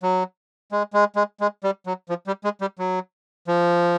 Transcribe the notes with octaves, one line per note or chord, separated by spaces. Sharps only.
F#3
G#3
G#3
G#3
G#3
G3
F#3
F3
G3
G#3
G3
F#3
F3